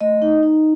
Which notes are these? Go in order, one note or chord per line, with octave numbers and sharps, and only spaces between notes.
A3 D#5
D#4
D#4